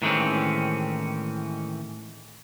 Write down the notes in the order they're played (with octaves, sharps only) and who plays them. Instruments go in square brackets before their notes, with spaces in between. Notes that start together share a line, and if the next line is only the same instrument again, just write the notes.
[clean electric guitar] A2 D#3 E3 G#3 C4 C#4